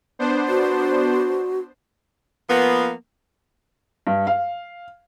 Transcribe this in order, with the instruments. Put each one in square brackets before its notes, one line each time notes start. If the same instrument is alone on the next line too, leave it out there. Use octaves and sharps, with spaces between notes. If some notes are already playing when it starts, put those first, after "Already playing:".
[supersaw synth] B3 D4 C5
[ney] F#4
[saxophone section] F3 A#3 B3
[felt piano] G2
F5